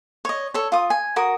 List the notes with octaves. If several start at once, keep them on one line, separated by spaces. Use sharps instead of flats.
C#5 D#5
A4 C#5
F4 D#6
G#5
F#4 A#4 D#6